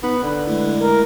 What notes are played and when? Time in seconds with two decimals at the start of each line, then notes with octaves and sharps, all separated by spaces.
0.03 B3 D#4 B4
0.23 G1 D3 B5
0.47 G#3 A3 E4
0.79 A#4